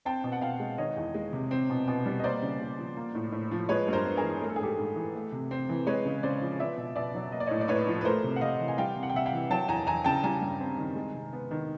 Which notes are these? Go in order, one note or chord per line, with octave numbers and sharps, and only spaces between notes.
C4 G5 A5
B2
F#5
B2 F5 G5
G#3
D#3 C#5 D#5
E2
G#3
C3
C4
B2
B2
G3
D#5
A#3 C5 D5
C#3
C#3
F3
A#3
A2
A2
F3
G#3 B4 C#5
G2 A#4 C5
B3
G#4 A#4
E3
A3 A#4
A4
G#4
G#2 G4 A4
G#2
E3
A3
C3
C4
E3
G#3 B4 C#5
C#3
C#3 C5 D5
F3
B3 D5 E5
B2
B2 D5 E5
F#3
A#3 D#5
D5
A2 C#5 D#5
D5
A2 B4 C#5
F3
B4
A3 A#4 C5
C3
F#5
C3 D#5 F5
E3
G#5
G3 F5 G5
C3
F#5
G5
C3 E5 F#5
F5 G5
E3
F#3 G5 A5
E2 G#5 A#5
E2 G#5 A#5
C#3 G5 A5
G3 G#5 A#5
G2
C4
D#3
G#3
C3
B3
D#3